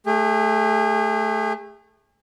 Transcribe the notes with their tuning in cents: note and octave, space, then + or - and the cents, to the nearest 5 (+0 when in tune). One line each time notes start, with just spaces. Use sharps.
A3 -5 G#4 -40